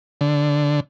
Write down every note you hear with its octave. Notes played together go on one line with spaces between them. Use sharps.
D3